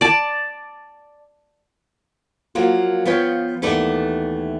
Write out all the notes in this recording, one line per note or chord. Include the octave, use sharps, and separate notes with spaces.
D5 A5
F3 F#3 A#3 F4
F3 B3 F4 C#5 G5
D#2 E3 A3 B3 A4 D5